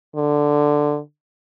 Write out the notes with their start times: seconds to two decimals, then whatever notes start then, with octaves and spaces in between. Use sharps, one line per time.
0.16 D3